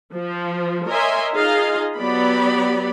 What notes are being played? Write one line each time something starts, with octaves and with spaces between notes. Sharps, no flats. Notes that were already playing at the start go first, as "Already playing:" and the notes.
F3
A#4 C#5 D#5 E5 G#5 C6
D#4 F4 G#4 D#5 F5
F#3 B3 G4 D5 B5